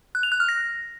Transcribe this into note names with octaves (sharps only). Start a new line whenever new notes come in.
F#6
F7
F#6
F6
A#6